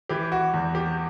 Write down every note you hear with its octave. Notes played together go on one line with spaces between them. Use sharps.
E3 G4
F#4
E2
G4